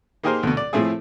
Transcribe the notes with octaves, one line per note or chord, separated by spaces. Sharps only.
A#3 D#4 G4 G#4 A#4 C5
D2 B2
D5
A2 F3 A3 C4 E4 G#4